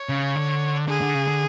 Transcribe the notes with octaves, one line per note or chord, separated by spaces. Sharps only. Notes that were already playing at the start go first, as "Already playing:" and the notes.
Already playing: C#5
C#3
D3
D3 G#4
D3
C#3
D3